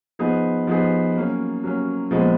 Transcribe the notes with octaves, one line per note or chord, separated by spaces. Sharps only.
F3 B3 D#4 G#4
F3 B3 D#4 G#4
F#3 A#3 C#4
F#3 A#3 C#4
A#2 F3 G#3 B3